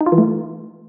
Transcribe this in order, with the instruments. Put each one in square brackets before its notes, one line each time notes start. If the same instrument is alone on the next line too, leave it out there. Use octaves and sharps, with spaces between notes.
[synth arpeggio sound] D#4
F4
E3
A3